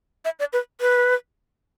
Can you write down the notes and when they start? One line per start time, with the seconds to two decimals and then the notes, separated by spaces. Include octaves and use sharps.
0.25 E5
0.40 D5
0.53 B4
0.81 B4